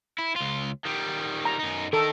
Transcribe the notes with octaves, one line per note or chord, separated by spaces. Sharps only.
E4
C#2 F4
D#3 G3
A#5
F#2 D#4
D#3 A4 A#4